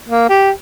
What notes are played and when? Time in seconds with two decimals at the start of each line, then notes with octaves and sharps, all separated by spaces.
0.08 A#3
0.29 G4